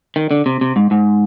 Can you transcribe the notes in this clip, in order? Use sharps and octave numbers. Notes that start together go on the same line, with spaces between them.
D#3
D3
C3
C3
G#2
G#2